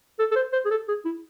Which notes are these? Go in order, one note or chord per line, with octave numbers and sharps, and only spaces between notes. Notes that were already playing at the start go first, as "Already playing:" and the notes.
A4
A4
C5
C5
G#4
A4
G#4
E4